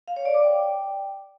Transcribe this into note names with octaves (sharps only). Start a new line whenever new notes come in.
F5
C#5
D5
D6
G5